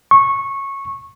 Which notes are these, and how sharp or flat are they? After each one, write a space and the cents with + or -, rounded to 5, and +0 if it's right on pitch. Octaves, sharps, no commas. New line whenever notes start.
C#6 -15